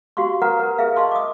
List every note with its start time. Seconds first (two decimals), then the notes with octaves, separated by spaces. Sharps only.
0.17 F#4 G4 F5 C6 C#6
0.42 A#4 B4 F5 F#5 A#5
0.60 A#4 B4
0.78 G#4 A#4 B4 E5 F5
0.96 D#5 F5 A5 C6 C#6
1.11 D6 D#6